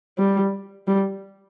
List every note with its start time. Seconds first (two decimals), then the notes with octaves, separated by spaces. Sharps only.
0.18 G3
0.87 G3